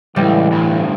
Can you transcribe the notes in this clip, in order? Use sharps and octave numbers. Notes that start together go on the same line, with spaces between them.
C#2 A2 E3 G3
D2 G2